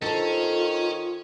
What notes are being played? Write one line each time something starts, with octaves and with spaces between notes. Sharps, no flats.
D#3 C#4 F4 A4 C5